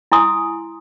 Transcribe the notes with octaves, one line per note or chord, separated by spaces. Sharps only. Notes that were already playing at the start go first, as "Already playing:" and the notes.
E4 G#5 C6 D#6